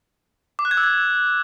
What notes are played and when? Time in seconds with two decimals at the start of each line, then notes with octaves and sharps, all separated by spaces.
0.59 D6
0.65 F#6
0.71 G#6
0.77 E6
0.83 G#6